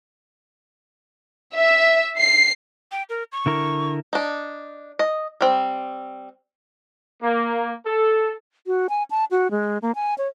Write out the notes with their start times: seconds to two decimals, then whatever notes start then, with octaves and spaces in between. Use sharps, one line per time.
1.55 E5
2.19 C7
2.92 G5
3.09 A#4
3.32 C#6
3.46 D3 E4 A#4
4.13 D4 D#4
4.99 D#5
5.41 G3 C4
7.22 A#3
7.86 A4
8.67 F#4
8.89 G#5
9.11 A5
9.31 F#4
9.51 G#3
9.82 A#3
9.95 G#5
10.18 C#5